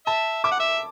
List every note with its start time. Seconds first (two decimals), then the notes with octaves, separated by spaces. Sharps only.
0.06 E5 A5
0.44 E5 D6
0.51 F#5
0.60 E5